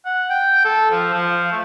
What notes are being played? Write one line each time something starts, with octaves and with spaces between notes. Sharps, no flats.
F#5
G5
A4
F3
F3
A3